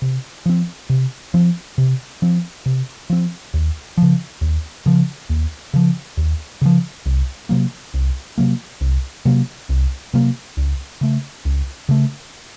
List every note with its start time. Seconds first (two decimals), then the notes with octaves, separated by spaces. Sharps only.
0.02 C3
0.46 F3 C4
0.90 C3
1.34 F3 C4
1.78 C3
2.22 F3 C4
2.66 C3
3.10 F3 C4
3.54 D#2
3.97 C#3 F3
4.41 D#2
4.86 C#3 F3
5.30 D#2
5.74 C#3 F3
6.17 D#2
6.62 C#3 F3
7.06 C2
7.49 C3 F#3 A#3
7.94 C2
8.38 C3 F#3 A#3
8.81 C2
9.25 C3 F#3 A#3
9.69 C2
10.14 C3 F#3 A#3
10.57 C#2
11.01 C#3 A3
11.45 C#2
11.89 C#3 A3